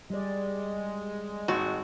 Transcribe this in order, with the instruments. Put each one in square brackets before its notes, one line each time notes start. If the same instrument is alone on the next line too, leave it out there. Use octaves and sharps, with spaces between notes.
[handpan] G3 D5 [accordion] G#3
[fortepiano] G#1 [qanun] F#4